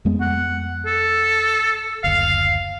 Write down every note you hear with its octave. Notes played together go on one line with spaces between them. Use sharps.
F2 G#3 B3
F#5
A4
F#1 D2 F5